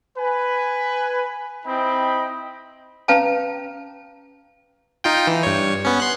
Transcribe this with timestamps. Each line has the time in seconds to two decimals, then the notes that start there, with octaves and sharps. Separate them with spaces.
0.18 B4 G#5
1.65 C4 D#4 E4 D#5 G5 B5
3.08 C#4 B4 F5 G5 A5 A#5
5.04 D#4 F4 G5
5.27 E3
5.43 G2 C#5
5.85 B3 C#4
6.00 C6 F#6